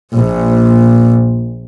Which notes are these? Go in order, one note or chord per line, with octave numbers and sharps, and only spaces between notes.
A#1 A#2